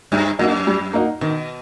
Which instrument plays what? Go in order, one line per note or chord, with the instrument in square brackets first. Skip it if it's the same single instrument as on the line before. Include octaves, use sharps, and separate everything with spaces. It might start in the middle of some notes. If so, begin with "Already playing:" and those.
[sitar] G2 [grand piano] G3
[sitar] F#2 [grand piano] A#3 D#4 F#4
[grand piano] G3
A#3 D#4 F#4
[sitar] B2 [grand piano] D#3